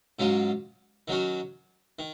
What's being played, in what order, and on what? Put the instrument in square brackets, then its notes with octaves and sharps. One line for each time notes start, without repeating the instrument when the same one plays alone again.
[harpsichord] G#2 F#3 C#4 F4
D#3 F#3 C#4 F#4
D#3